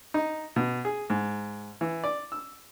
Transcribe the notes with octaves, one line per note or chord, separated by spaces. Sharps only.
D#4
B2
G#4
G#2
E3
D5
E6